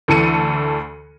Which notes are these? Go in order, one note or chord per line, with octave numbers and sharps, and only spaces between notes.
D2 E3 A4 C#7 D#7